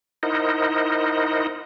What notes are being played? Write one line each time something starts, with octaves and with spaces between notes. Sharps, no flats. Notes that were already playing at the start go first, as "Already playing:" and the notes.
D#4 E4 A#4 C5 D#5 F#5